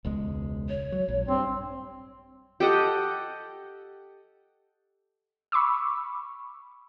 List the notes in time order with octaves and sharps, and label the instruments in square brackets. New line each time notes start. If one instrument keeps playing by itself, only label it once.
[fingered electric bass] E1 C#2 G#3
[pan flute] C#5
[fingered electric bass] F#3
A#1
[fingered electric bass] G2 [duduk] C4
[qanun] G4 A4 D#5 F#5
[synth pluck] B5 C#6 D6 E6